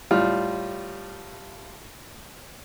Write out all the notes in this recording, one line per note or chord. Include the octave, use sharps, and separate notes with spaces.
A2 G3 F4 F6